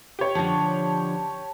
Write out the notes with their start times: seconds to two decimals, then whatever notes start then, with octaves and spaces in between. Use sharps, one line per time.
0.19 G4 C#5
0.35 D3 F3 A5